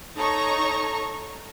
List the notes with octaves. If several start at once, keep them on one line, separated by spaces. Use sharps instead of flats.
D#4 A4 C#5 A#5 C#6